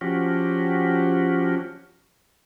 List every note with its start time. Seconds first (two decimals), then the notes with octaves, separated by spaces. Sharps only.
0.01 F3 C#4 F#4 G4